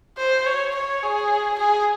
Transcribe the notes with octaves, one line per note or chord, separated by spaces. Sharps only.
C5
C#5
C#5
G#4
G#4